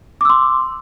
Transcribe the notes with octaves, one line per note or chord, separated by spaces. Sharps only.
C6 D6 E6